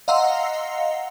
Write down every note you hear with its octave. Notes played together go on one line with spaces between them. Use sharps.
D#5 F5 F#5 A#5 C6 E6